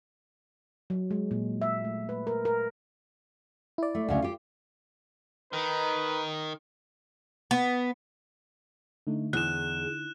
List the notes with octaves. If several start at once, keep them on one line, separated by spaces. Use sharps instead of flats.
F#3
G#3
A#2
E5
A3
B4
A#4
A#4
E4 D5
A3
D2 C#3
F4 G4
D#3 D#4 B4
B3
D3 A3 D#4
E2 G#4 F#6 E7